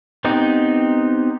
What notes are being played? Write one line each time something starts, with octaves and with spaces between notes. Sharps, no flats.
B3 C4 D#4 G4